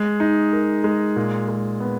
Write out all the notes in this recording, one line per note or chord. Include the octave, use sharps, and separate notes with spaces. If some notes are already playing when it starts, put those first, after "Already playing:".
Already playing: G#3
D#4
A#4
G#3
A#2
G#3
B3